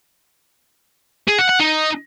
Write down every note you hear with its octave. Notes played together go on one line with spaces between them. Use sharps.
G#4
F#5
F#5
D#4